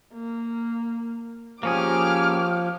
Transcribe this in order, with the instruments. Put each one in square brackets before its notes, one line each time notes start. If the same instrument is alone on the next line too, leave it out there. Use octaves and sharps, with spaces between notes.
[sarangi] A#3
[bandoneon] F3 [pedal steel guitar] A#3 C#4 G#4 [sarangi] G4 [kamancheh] D6 F6